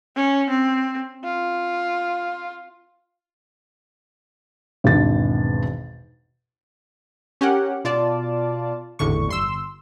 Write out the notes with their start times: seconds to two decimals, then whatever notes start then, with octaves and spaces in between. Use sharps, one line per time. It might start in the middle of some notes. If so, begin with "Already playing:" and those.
0.16 C#4
0.50 C4
1.24 F4
4.84 G#1 E2 B2 D4 A6
7.41 C#4 G4 A#4 F#5
7.84 B2 F4 D5 A5
8.99 G#1 E2 A2 D3 C#6
9.28 G1 C6 E6